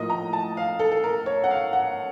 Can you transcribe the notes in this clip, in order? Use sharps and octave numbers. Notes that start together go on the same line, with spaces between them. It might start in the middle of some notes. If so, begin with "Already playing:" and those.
Already playing: A2 F3 A#3 F4 D#5
A#5
A5
F5
A4
A4
A#4
C#5
F#5
F5
F#5